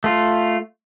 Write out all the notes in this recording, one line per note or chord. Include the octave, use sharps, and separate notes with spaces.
A3 F4